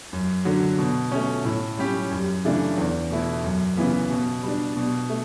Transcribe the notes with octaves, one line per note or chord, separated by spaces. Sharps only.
F#2
D3 F#3
B2
A3 C#4
A2
G3 C#4 G4
F#2
C#3 E3 A3 D4
E2
B2 A3 E4
F#2
C#3 E3 B3
B2
G3 D4
B2
A3